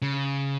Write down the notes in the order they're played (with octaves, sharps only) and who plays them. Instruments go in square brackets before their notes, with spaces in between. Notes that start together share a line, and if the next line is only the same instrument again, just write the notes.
[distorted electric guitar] C#3